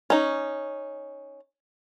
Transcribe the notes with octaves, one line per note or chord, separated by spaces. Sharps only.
C#4 D#4